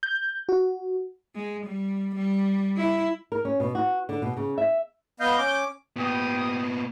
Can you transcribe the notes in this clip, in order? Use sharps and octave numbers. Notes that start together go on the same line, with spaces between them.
G6
F#4
G#3
G3
G3
E4
A#4
C#4
B2
F#4
D3
B2
C#3
E5
B3 D#5 F5 G6
C#4 D6
A#2 B3 G4 G5 D#6